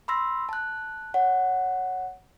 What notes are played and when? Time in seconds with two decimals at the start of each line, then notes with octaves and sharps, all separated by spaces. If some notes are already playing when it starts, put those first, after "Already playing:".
0.08 B5 C6 E6 A#6
0.49 A5 F#6
1.14 C#5 F#5